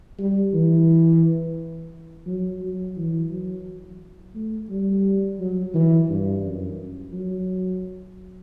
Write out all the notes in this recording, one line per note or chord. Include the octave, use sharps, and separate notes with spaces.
G3
E3
F#3
F#3
E3
F#3
A3
G3
F#3
E3
G2
F#2
F#3